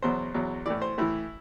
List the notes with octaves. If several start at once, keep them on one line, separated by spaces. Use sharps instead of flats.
E2 B2 F#3 C5
E2 B2 F#3
A2 E3 D5
C5
A2 E3 E4